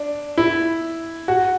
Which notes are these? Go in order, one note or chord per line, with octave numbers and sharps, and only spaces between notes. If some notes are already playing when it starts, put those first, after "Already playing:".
Already playing: D4
E4
F#4